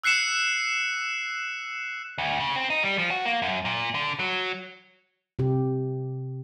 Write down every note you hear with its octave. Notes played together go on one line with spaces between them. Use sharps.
E6 F#6 C7 C#7 E7
D2
C#3
C4
D#4
G3
F3
F#4
A#3
F#2
A#2
D3
F#3
C3 G4